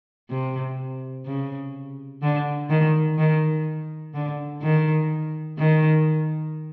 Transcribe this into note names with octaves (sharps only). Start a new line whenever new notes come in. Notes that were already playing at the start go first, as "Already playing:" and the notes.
C3
C#3
D3
D#3
D#3
D3
D#3
D#3